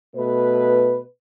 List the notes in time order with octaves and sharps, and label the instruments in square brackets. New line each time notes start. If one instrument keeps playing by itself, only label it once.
[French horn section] B2 A3 B4